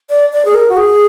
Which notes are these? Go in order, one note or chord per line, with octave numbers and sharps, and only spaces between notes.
D5
D5
G#4
A#4
F#4
G#4